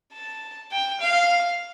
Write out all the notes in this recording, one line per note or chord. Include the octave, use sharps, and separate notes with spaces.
A5
G5
F5